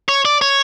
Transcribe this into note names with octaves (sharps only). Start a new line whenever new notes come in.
C#5
D5
C#5